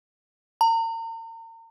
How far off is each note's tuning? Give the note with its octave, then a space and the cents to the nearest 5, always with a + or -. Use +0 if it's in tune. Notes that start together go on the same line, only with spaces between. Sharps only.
A#5 -40